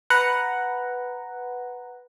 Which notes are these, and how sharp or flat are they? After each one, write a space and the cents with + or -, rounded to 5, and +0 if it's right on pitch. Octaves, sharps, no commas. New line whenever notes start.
B4 +0 F#5 +0 A#5 +0